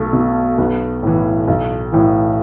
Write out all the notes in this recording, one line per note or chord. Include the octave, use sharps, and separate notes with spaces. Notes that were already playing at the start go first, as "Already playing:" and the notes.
Already playing: B1 A3
B2
B1 B3
A2 E3
B1
A2 E3